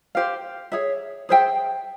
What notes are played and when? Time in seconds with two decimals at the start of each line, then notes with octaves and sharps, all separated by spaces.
0.15 G4 C5 F5
0.72 G#4 C#5 E5
1.29 G#4 C5 E5 G5